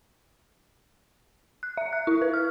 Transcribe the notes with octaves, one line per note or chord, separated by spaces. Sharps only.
F#6
E5
F#6
E4
B4
F6